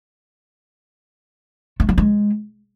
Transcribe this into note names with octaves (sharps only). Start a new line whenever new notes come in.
A3
G3
G#3